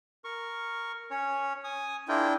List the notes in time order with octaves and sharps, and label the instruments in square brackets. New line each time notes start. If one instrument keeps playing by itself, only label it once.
[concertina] A#4 C#6
C#4 C#5
G#5 D#6
[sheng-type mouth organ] D4 E4 G5 [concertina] F4 G#4 A#4